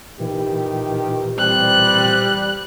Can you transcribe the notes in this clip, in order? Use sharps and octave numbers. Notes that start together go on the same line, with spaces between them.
A#2 D#3 E3 G4
G3 C4 F#6